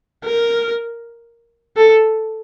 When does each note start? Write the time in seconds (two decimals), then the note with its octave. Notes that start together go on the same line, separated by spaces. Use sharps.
0.24 A#4
1.76 A4